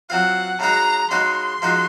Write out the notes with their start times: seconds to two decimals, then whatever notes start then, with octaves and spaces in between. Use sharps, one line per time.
0.10 F#3 C4 F4 F#5
0.60 C#3 G#3 D#4 F#4 A#5
1.11 C#3 G#3 D#4 F#4 C6
1.62 F3 G#3 D#4 F#4